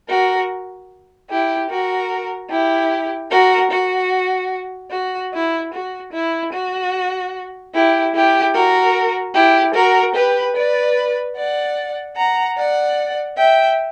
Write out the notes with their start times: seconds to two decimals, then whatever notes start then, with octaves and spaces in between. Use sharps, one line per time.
0.09 F#4 A#4
1.29 E4 G4
1.69 F#4 A#4
2.50 E4 G4
3.30 F#4 A#4
3.71 F#4
4.91 F#4
5.32 E4
5.72 F#4
6.12 E4
6.52 F#4
7.73 E4 G4
8.13 E4 G4
8.54 F#4 A#4
9.34 E4 G4
9.74 F#4 A#4
10.14 G4 B4
10.55 B4 D5
11.36 D5 F#5
12.15 F#5 A#5
12.56 D5 F#5
13.37 E5 G5